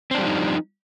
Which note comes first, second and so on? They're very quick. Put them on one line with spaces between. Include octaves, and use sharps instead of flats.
C4 D4 G3 F3 D#4